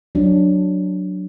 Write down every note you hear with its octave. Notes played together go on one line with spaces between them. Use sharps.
F#3 D4